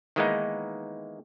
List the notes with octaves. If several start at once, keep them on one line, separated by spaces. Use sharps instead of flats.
D#3 E3 G#3 A#3 B3 D#4